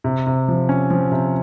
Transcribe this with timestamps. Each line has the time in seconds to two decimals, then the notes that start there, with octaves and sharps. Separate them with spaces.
0.04 C3
0.27 C3
0.48 F3
0.69 C#4
0.90 F3
1.12 C3